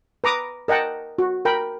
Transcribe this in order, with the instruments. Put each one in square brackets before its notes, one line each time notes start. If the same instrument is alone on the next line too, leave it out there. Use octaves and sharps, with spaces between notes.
[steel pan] B4 A#5 D6 D#6
A#4 D#5 F#5 G5 A5
F#4
A#4 G5 B5